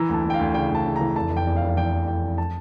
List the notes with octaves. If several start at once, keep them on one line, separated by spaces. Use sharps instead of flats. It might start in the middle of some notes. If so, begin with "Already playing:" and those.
Already playing: E3 A#5
D2 A5
D2
G5
F5
D2
C#3 G5
D2 A5
C#3
A#5
E3
F1 A5
F1
G5
E2
F5
F1
F5
E3 G5
F1
F1 G5
F1
A5